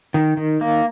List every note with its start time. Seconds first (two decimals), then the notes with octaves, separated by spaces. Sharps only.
0.14 D#3
0.37 D#3
0.61 A#3